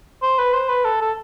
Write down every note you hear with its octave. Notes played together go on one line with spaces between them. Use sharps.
C5
B4
C5
B4
A4
A4